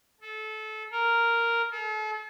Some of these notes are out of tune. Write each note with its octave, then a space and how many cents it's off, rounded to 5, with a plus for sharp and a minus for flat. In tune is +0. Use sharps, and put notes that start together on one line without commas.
A4 -25
A#4 -5
A4 -40